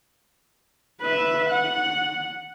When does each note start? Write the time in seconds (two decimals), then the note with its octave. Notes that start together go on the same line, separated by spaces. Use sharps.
1.02 B4 E5
1.50 F#5